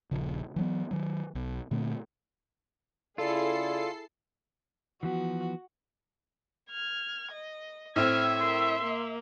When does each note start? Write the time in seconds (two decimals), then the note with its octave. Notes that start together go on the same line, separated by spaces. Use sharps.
0.11 D#1 A#1 C#3
0.56 E3 F#3 B3
0.91 D#3 F#3
1.35 B1
1.71 A#2 D3 A3 C4
3.18 C#3 E4 F4 G#4 A4 D5 C7
5.03 E3 F3 B3 F#4
6.70 F6 G#6
7.31 D#5
7.96 A2 C4 E5 E6 F6 G#6
8.40 A#4 C6
8.82 A#3